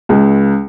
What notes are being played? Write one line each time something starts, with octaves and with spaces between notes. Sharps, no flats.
C#2